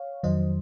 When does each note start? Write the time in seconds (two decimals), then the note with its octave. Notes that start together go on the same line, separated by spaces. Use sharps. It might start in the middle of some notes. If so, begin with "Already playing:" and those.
Already playing: C#5 F5
0.23 F2 D#3 F#3 C5 D#5